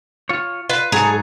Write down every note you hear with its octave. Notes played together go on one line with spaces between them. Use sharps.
F4 C#5
F4 B4
G#2 F#3 G#4 A4 A#5